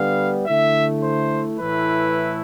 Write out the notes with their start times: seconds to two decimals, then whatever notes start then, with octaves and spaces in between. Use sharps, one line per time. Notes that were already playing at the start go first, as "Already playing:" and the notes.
Already playing: D3 G3 B3 F5
0.47 D3 A3 E4 E5
1.03 C5
1.60 A2 E3 A3 E4 B4